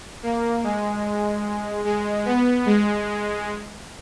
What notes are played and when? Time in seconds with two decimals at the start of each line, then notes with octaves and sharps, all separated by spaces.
0.23 A#3
0.64 G#3
1.85 G#3
2.25 B3
2.66 G#3